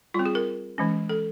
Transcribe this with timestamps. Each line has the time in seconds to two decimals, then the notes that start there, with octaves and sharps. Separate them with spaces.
0.14 G3 C4 F4
0.26 G#4
0.35 A#4
0.78 E3 G#3 C#4
1.09 A4